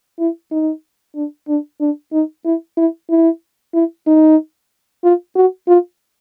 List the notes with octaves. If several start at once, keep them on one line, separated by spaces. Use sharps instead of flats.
E4
D#4
D4
D4
D4
D#4
E4
E4
E4
E4
D#4
F4
F#4
F4